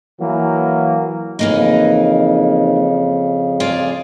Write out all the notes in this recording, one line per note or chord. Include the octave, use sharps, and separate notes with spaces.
E3 F#3 A#3
F2 C#3 E3 A#3 D#4
F4 G#4 D5